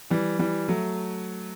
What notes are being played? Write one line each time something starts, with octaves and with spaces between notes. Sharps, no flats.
E3 G3
E3 G3
F#3 A3